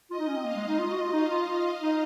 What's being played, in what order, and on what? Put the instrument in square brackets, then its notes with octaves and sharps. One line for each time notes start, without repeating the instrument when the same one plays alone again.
[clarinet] F4 [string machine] D#5
[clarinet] D#4
C#4
C4
[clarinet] A#3 [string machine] F5
[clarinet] G#3
D#4
[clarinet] F4 [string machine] D#5
[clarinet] F#4
F4
[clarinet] D#4 [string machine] F5
[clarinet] F4
F4
D#4